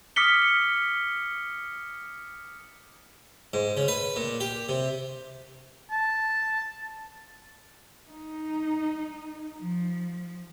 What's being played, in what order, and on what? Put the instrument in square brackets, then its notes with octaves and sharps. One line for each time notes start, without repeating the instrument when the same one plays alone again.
[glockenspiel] D6 D#6 F6 B6 C#7 G7
[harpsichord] G#2
C#3
B4
A#2
G4
C3
[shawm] A5
[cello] D#4
F3